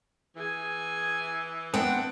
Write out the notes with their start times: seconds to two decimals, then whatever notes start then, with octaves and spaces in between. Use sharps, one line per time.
0.36 E3 G#4 G#5
1.74 B3 C4 D4 F#5 G5 A5